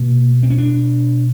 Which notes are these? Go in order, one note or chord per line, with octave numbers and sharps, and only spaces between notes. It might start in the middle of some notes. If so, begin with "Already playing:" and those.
Already playing: B2 A#3
C4
C#4
D4